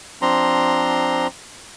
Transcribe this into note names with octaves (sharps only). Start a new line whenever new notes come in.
F3 C4 D4 A#5 C6